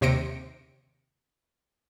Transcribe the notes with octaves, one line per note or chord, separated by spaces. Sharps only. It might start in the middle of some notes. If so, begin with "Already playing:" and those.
D#2 C3 C5 A#6 C#7 D7